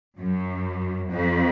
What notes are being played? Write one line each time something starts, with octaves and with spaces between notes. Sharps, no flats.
F#2
F2